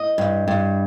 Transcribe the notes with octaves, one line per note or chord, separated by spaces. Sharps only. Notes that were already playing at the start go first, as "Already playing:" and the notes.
Already playing: D#5
G2
G2